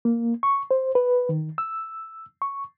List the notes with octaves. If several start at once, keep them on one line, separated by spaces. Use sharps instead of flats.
A#3
C#6
C5
B4
D#3
E6
C#6